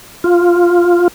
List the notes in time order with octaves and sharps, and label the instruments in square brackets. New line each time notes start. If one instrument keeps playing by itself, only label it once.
[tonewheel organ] F4